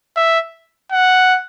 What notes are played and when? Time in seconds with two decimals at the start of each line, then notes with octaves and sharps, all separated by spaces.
0.17 E5
0.92 F#5